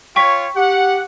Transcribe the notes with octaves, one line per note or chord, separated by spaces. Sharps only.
F4 C#5 G5 C#6 B6
G4 F#5